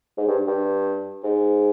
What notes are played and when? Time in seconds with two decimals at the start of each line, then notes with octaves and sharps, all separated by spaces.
0.17 G#2
0.28 G2
0.47 G2
1.24 G#2